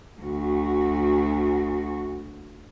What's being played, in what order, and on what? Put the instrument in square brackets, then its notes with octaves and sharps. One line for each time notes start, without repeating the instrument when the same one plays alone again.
[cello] D2 F#4